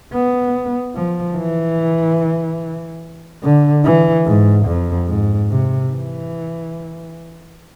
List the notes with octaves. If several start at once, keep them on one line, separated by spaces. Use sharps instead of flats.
B3
F3
E3
D3
E3
G#2
F2
G#2
C3
E3